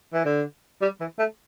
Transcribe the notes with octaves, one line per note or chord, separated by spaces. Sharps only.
E3
D3
G3
E3
A3